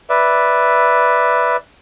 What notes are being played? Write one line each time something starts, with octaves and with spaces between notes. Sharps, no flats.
B4 D5 E5